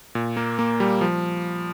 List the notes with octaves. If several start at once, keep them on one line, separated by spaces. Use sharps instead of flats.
A#2
A#3
A#3
G3
F3